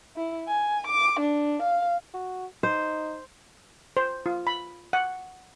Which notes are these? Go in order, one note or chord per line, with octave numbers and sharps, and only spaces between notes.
E4
G#5
D6
D4
F5
F#4
D#4 C5
C5
F4
B5
F#5